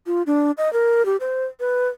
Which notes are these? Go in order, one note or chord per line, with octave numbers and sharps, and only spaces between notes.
F4
D4
D#5
A#4
G4
C5
B4